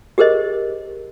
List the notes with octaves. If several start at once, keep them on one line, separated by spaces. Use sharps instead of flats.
G4 G#4 A#4 C5 D#5